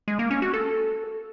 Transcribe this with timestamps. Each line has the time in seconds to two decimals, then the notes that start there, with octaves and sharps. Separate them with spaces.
0.08 G#3
0.19 A#3
0.31 C#4
0.42 F#4
0.54 A4